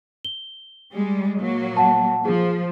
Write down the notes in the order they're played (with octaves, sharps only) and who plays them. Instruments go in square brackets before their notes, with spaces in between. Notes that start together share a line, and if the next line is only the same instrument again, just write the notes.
[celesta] G7
[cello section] G3 G#3
A#2 F#3 A#3
[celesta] F#5 A5
[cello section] F3 [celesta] G#4